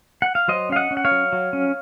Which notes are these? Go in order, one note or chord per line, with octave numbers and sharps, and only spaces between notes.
F#5
F5
F#3 C5 D#5
C#4 F5
D#5 F#5
C#4
F#5
C#5 F5
F#3
F#3
C#4